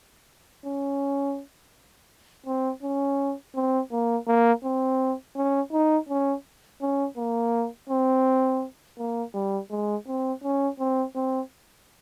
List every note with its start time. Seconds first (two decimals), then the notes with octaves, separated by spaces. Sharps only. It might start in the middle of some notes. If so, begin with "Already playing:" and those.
0.65 C#4
2.46 C4
2.83 C#4
3.55 C4
3.92 A#3
4.27 A#3
4.64 C4
5.36 C#4
5.73 D#4
6.09 C#4
6.81 C#4
7.17 A#3
7.89 C4
8.98 A#3
9.34 G3
9.71 G#3
10.08 C4
10.43 C#4
10.80 C4
11.15 C4